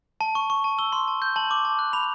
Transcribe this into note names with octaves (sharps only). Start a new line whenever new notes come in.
A5
C#6
C#6
A5
E6 G7
C6
A5
G6
A5 F#7
D6
A5
F#6
B5 F7